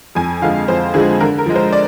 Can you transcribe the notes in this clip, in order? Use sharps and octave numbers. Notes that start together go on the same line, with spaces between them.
F2 G#5
D3 F3 G#3 F5
F2 C5
D3 F3 G#3 G#4
D3 A#4
A#4
F3 G#3
C5
D5